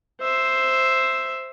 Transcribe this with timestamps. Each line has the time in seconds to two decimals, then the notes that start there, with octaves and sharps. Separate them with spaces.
0.21 C5 E5